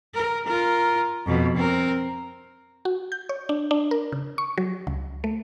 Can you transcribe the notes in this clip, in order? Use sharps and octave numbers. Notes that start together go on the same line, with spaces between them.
A#4
F4 A#4
F2 B2
C4 A#4
F#4
G6
C#5
D4
D4
A#4
C#3
C#6
F#3
C#2
A3